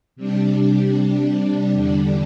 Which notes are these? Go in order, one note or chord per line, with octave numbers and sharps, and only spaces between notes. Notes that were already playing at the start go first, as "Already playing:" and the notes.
C3 G3 D4
E2 D3 G3 D4